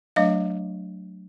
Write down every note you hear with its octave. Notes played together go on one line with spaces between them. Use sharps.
F#3 A3 D4 D#5 F5